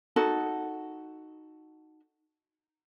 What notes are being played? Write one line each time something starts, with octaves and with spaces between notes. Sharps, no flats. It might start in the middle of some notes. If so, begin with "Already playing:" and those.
D#4 F#4 A4